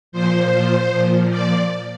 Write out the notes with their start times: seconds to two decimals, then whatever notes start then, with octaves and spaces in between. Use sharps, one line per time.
0.12 A#2 F3 C5
0.91 A#2 F3
1.29 D5